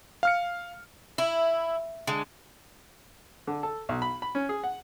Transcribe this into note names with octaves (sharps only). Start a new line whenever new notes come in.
F5 F6 C#7
E4
D3 G#3
D3
A4
B1
B5
B5
C#4
G#4
F#5